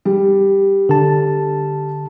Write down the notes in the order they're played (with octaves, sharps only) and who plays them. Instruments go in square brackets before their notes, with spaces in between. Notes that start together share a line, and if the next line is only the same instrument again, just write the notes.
[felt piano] G3
[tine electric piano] D3 A5